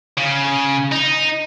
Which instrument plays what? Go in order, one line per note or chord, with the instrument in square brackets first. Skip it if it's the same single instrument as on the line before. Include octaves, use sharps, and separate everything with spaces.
[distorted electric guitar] C#3
D#4